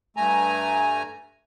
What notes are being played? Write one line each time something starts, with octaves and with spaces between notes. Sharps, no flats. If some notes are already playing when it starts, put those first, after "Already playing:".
G2 A3 G#5 A#5